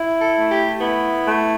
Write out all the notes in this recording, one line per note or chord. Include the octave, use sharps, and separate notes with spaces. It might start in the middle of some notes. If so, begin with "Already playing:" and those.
Already playing: E4
A4
A3
G4
B3 E4
A3